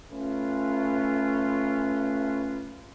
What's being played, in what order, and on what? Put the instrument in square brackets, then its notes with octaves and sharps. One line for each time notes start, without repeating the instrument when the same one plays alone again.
[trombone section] A3 C#4 F4 B4